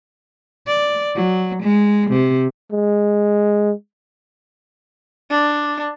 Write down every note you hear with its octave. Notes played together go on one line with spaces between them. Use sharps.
D5
F#3
G#3
C3
G#3
D4